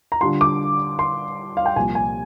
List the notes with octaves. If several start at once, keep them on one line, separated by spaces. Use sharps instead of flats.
A#5
D3 G3 D4 F4 C6
D6
C6
F5
G5
C2 A#2 F3 G#5
G#5